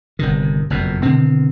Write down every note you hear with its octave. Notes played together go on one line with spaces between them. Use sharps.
G1 C3 D#3
F#1 F2 B2
B2 D3 D#3 C4